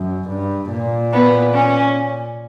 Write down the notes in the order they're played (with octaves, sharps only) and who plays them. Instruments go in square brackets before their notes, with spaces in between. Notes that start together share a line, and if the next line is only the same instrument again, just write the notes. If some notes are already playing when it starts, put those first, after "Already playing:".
Already playing: [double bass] F#2
G2
A#2
[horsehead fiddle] B3
C#4